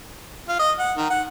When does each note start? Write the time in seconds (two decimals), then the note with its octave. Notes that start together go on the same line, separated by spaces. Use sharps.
0.48 F4
0.59 D#5
0.79 F#5
0.98 D#3
1.10 F#5